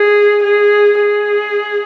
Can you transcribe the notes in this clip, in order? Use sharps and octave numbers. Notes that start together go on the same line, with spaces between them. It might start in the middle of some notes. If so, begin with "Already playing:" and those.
Already playing: G#4
G#4
G#4